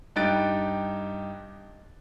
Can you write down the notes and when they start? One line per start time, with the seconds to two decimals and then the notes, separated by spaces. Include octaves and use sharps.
0.16 G2 D#4 G4 F#6 A6 D7